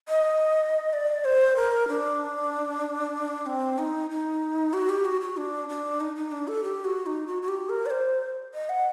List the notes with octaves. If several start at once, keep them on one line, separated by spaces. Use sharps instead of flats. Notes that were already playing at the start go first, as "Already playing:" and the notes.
D#5
D5
C5
A#4
D4
C4
D#4
D#4
F#4
G4
F#4
F#4
D4
D4
D#4
D#4
D4
A4
G4
F#4
D#4
F#4
F#4
G4
A#4
D5
C5
D#5
F#5